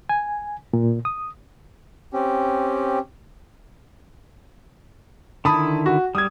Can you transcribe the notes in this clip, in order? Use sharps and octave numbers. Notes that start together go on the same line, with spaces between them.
G#5
A#2
D#6
C4 C#4 G4
D3 D#3 E4 A5 B5 D#6
F#4
G3 D#6 G#6